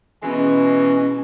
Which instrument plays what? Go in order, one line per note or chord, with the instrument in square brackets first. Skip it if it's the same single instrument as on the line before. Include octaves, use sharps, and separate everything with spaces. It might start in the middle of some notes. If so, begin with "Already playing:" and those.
[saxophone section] B2 E3 G#3 [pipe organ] C#4